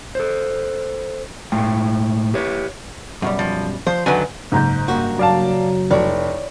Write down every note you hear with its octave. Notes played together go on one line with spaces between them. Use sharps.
A4 C5
A2 G#3 G5
G4 B4 C#5
F#2 B2 G3
F3
F3 C5
F#2 D3 D#3 F#3 B4 G#5
F#1 G#2 A#5 G6
G2 A#3 F#4
F#3 D5 F5 A5
F1 E4 C#5 D5